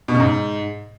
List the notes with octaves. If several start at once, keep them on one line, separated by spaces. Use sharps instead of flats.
B2
C#3
G#2